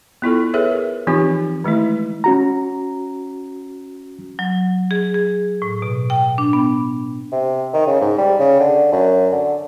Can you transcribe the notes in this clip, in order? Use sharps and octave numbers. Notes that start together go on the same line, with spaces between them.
B3 E4 F4 A4
G#4 A4 B4 C#5 E5
A#4
E3 F3 C4 D#4 F4 G4
D#3 G#3 A3 E4
C#4 F#4 A#5
F#3
G#4
G#4
A2
B2
G5
D4
B3
C3
D#3
C#3
G#2
G3
C#3
D3
F#2
D3